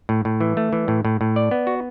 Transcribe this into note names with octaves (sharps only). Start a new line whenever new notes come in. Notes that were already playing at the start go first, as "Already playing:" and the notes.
A2
A2
E3
A3
E3
A2
A2
A2
D5
B3
F#4